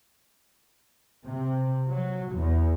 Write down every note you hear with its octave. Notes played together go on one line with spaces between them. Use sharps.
C3
F#3
E2